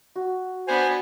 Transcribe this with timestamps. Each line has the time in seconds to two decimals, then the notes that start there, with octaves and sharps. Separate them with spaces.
0.16 F#4
0.68 B3 D4 C5 G#5